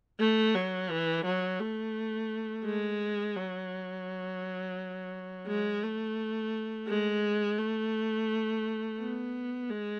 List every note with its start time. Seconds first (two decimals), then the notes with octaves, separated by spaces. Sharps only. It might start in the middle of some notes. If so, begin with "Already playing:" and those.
0.19 A3
0.55 F#3
0.90 E3
1.25 F#3
1.60 A3
2.65 G#3
3.36 F#3
5.47 G#3
5.83 A3
6.88 G#3
7.59 A3
8.99 B3
9.69 G#3